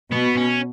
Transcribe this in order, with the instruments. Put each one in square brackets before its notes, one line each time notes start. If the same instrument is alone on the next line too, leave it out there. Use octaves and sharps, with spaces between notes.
[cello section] B2 [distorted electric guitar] B3
[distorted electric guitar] C#4